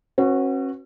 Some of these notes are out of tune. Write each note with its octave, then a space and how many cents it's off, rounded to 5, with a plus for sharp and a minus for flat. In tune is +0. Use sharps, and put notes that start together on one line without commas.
C#4 -40 F#4 -5 B4 -10